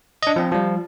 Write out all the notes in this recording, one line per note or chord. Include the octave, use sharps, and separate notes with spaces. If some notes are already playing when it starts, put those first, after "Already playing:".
D4 D#5
F3 C4
F3 G3